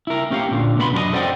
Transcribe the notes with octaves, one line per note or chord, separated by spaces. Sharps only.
E4 A#4
A#3 C#4 G4 C#5 F5
A#2 D3
B2 B3 D5 B5 C6
F#2 D4 G4 D#5
A4 C5 D5 D#5 F#5 G5